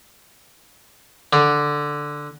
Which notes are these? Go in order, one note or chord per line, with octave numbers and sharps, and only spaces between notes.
D3